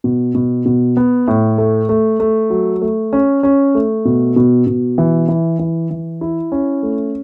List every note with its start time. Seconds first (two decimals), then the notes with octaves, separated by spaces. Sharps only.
0.04 B2
0.35 B2
0.66 B2
0.97 B3
1.28 A2
1.58 A3
1.89 A3
2.20 A3
2.50 F#3
2.82 A3
3.13 C#4
3.43 C#4
3.75 A3
4.05 B2
4.36 B2
4.67 B2
4.98 E3
5.28 E3
5.59 E3
5.90 E3
6.21 E4
6.52 C#4
6.83 A3